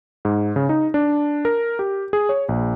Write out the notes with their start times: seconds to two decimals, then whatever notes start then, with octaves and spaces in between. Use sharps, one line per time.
0.25 G#2
0.56 C#3
0.69 D#4
0.94 D4
1.45 A#4
1.79 G4
2.13 G#4
2.29 C#5
2.49 A#1